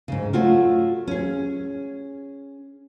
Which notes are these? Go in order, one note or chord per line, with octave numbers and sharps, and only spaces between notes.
G#2 C#3
A3 F4 F#4 A4 C#5
C#4 G#4